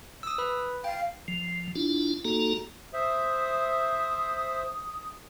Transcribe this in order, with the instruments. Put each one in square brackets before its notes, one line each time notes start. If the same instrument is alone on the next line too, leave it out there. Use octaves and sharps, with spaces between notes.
[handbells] D#6 E6
B4 B5
[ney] F5 [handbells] G5
[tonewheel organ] F3
D4 E4 F4
A#3 D#4 F#4 A4 A#5
[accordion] C5 E5 [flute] D#6